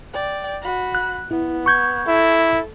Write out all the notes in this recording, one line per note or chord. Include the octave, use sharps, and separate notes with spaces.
D5 G5
F#4 B5
F#6
B3 E4
C#6 G6 G#6
E4 A4